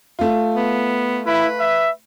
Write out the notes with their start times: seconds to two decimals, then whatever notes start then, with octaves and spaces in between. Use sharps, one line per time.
0.19 A3 F4
0.55 B3
1.27 E4 B4
1.60 E5